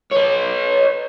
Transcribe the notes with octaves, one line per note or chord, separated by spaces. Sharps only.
B4 C#5